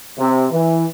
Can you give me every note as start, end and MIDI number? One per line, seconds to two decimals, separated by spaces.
0.19 0.46 48
0.51 0.85 52